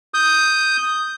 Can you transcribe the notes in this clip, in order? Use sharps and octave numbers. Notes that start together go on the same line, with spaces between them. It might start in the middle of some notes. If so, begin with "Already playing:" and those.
D#6 G6